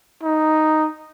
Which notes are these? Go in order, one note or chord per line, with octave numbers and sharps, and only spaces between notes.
D#4